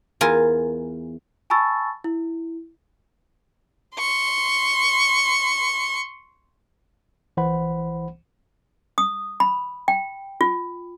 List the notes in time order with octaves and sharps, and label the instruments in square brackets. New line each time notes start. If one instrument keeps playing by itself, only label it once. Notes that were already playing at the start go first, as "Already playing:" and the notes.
[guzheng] E2 F4 A#4 G#5
[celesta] G#5 A5 B5 C#6 E6 A6
E4
[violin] C6 C#6
[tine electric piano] B1 E3 C5 F#5 B5
[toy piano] D#6
B5
G5
F4